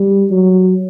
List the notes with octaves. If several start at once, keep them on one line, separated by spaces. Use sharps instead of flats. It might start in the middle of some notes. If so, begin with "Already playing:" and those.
Already playing: G3
F#3